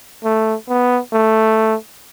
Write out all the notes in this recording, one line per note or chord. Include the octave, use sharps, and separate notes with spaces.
A3
B3
A3